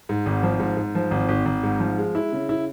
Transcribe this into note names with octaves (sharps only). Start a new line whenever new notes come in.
G#2
G#1
F3
G#2
G#2
F3
G#1
G#1
G#1
G#2
F3
G#3
E4
C#3
E4